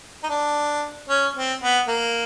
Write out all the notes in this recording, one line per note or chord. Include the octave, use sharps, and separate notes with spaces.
D#4
D4
C#4
C4
B3
A#3